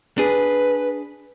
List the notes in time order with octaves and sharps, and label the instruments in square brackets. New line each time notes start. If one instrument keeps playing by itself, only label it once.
[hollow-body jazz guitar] D4 G#4 [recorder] B4